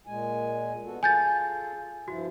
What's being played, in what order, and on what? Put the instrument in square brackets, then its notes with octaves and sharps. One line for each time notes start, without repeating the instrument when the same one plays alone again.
[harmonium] A#2 G#3 G#5
B3 F#4 A4
[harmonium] F4 G#4 A4 [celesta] G#5 G6 A6
[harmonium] G2 F3 E4 [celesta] F#4